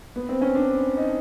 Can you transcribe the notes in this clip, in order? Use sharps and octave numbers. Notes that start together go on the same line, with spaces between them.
B3
C4
C#4
D4
D#4